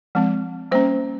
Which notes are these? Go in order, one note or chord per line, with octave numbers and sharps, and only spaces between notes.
F3 G#3 C4
G3 A#3 C#4 C5